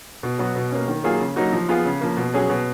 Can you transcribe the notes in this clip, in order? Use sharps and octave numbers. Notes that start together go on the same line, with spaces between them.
B2
F#3 B3 F#4
B2
A#3 C#4
D#3
F#3 A#3 F4 G#4
C#3
F#3 A#3 D#4 F#4
F3
B3 F4 G#4
C#3
F3 A#3
B2
F#3 C#4 G#4
B2